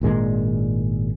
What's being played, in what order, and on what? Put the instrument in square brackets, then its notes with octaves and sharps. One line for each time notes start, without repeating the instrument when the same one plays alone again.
[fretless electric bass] G#1 A#2 G#3 D4